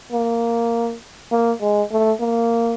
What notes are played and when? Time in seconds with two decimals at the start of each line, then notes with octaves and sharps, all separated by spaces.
0.12 A#3
1.32 A#3
1.62 G#3
1.91 A3
2.21 A#3